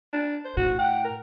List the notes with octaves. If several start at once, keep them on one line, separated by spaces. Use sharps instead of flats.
D4
C5
A2 F#4
F#5 G5
A#4